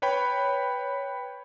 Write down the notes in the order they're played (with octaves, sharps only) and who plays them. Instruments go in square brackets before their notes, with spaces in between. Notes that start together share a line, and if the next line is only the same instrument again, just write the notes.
[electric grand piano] B4 C#5 G5 B5